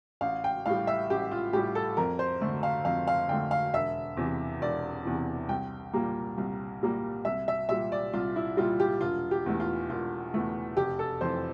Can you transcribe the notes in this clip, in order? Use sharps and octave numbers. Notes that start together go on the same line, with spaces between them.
A1 F5
G5
A2 G3 F5
E5
A1 G4
F4
A2 G3 G4
A4
F2 A#4
C5
D3 A3
F5
F2 F5
F5
D3 A3 G5
F5
E1 E5
E2 C3 E3
E1 D5
E2 C3 E3
C2 G5
A#2 G3 A#3
C2
A#2 G3 A#3
C2 E5
E5
A#2 G3 E5
D5
C2 F4
E4
A#2 G3 F4
G4
E1 F4
G4
E2 E3 A3
F4
E1 F4
E2 E3 A3
F1 G4
A4
F2 E3 C5